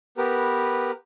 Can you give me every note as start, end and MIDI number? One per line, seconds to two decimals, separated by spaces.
0.18 0.91 59
0.18 0.91 67
0.18 0.91 70
0.18 0.91 71